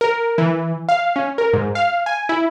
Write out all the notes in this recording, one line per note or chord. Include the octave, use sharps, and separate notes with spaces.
A#4
E3
F5
C#4
A#4
G#2
F5
G#5
E4